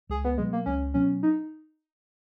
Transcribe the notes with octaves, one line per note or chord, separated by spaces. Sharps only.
C#2 G#4
B3
B2 F#3 G#3 B3
A#3
C#2 C#4
B2 F#3 B3 C#4
D#4